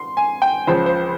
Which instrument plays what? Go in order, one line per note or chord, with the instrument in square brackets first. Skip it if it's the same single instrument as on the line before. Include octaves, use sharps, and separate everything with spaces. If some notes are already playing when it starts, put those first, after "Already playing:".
Already playing: [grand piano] C6
G#5
G5
C#2 C#3 F3 C5
C5